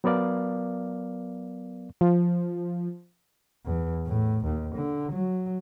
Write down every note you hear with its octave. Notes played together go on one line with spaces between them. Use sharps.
F#3 B3 A#4 D5 F5
F3
E2
A2
D#2
D3
F#3